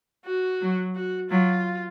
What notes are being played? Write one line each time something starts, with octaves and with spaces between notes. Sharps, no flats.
F#4
F#3
F#4
F#3 F4